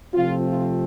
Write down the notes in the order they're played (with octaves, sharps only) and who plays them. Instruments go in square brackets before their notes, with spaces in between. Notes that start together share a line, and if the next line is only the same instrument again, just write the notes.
[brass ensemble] C3 F3 A3 C4 F4
F4